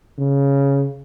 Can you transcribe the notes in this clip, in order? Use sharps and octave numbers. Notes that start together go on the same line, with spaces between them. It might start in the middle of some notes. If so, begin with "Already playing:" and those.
C#3